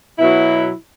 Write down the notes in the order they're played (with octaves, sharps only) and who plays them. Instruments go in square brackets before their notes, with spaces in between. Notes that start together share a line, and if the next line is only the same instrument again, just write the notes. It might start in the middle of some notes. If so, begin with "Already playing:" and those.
[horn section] B2 F#3 E4